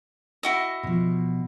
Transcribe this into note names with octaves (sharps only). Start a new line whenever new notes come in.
E4 F#4 D#5
B2 F3